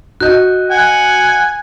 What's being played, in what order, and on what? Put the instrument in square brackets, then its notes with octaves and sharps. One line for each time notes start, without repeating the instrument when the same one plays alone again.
[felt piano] F#4 D#5 [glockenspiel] F#6 G6
[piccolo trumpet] F#5 [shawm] G#5